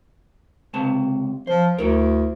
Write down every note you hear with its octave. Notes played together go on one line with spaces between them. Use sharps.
C#2 C3 A5
F3 C5
D2 E4 A#4